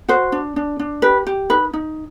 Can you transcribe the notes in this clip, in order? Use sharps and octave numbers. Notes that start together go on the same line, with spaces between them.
F#4 C5
D4
D4
D4
G4 B4
G4
D#4 B4
D#4